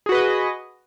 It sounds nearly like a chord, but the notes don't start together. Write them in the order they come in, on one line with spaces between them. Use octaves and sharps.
G#4 F#4 B4 D#5